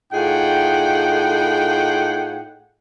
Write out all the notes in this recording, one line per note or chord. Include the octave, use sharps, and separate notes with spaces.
A2 D#4 F4 G#4 F#5 G5